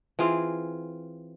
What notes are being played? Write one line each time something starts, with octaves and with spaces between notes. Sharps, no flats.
E3 C4 F4 G#4